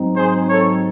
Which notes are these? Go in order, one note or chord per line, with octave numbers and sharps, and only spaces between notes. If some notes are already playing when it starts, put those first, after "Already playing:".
Already playing: G#2 F#3 C4 D#4
G#4 C5
A4 C#5